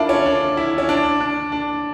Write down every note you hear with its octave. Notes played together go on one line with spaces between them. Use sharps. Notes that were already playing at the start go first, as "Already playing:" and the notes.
Already playing: D4 E4 F4 A4 A#4
C#4
D4
E4
C#4
D4
D4
D4